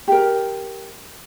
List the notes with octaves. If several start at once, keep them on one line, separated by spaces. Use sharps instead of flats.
G4 A#4